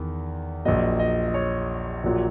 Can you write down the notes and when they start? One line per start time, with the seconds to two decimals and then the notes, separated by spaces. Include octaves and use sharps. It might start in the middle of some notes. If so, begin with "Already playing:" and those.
Already playing: E2 D#3
0.65 A#1 A#2 F#3 D#5
0.99 D#5
1.28 D#5
1.34 C#5
2.04 A#1 A#2 F#3